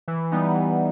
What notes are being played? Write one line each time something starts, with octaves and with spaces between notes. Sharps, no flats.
E3
G3 B3 D#4
E3